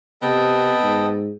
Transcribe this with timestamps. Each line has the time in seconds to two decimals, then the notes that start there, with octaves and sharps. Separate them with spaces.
0.22 C3 B3 A4 D#5 G5
0.83 G#2